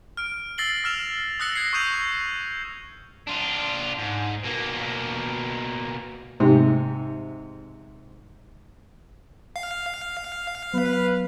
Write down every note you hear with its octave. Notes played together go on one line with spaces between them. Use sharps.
F6 D7
E6 A6 A#6 C7 F#7 G7
E6 F6 E7 F7
D#6 E6 F#6 A6 A#6 C#7
G#6 C7
C#6 D#6 E6 G6 D#7 F7
D4 F4
G#2
B2 A#3
G#2 C3
F5
F#3 B3 B4